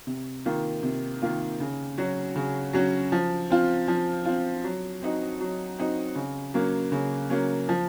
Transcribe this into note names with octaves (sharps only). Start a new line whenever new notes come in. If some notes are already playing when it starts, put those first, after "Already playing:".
C3
D#3 A#3 F4
C3
D#3 A#3 F4
C#3
F#3 C#4 F#4
C#3
F#3 C#4 F#4
F3
C4 F4
F3
C4 F4
F#3
C4 D#4 F#4
F#3
C4 D#4 F#4
C#3
F#3 A#3 C#4
C#3
F#3 A#3 C#4
F3